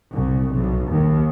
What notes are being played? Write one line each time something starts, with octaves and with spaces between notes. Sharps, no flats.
C2
B1
D#2